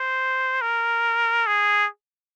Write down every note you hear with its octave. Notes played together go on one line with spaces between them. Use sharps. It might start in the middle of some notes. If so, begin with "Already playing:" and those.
Already playing: C5
A#4
G#4